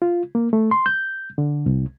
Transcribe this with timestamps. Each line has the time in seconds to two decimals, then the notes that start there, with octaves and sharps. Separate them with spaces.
0.02 F4
0.35 A#3
0.53 A3
0.71 C6
0.86 G6
1.38 D3
1.66 C2